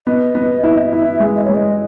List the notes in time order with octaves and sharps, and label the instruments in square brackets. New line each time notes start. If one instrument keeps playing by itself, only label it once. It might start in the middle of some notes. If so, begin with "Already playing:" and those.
[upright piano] B3 [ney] D#5
[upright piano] B3
E4
[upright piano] E4 [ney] E5
[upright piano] G#3
[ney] D#5
C#5
[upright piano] G#3
[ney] D#5